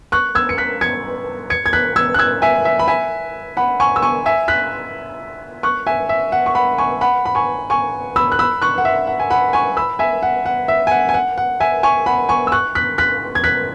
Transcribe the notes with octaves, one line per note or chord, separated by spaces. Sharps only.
C#6 F#6
E6 G#6
C#7
F#6 B6
G#6 C#7
G#6 C#7
G#6
F#6 B6
E6 G#6
F#6
E6 G#6
E5 G#5
E5
B5
E5 G#5
F#5 B5
G#5 C#6
E6
G#5 C#6
E5 G#5
F#6 B6
C#6 F#6
E5 G#5
E5
F#5
C#6
F#5 B5
G#5 C#6
F#5 B5
B5
G#5 C#6
G#5 C#6
B5 E6
F#6
B5 E6
C#6 F#6
F#5
E5
F#5
G#5
F#5 B5
G#5 C#6
B5 E6
E5 G#5
F#5
F#5
E5
G#5
F#5
G#5
F#5
F#5
E5 G#5
G#5 C#6
F#5 B5
G#5 C#6
E6
C#6 F#6
F#6 B6
F#6 B6
G#6
F#6 B6